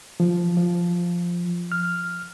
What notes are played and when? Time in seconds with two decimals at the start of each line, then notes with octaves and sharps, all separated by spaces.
0.20 F3
0.57 F3
1.72 F6